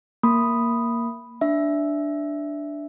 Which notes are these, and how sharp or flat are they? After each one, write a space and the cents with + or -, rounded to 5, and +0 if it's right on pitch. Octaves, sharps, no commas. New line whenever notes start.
A#3 +0 B5 +0 D#6 -5
D4 +0 E5 +0